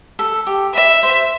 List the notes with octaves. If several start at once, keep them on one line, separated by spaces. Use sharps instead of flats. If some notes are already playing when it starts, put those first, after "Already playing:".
A4
G4
B4 E5
C5